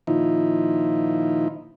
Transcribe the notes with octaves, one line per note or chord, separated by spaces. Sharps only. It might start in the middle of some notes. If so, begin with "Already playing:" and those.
A#2 D#3 F3 D#4 E4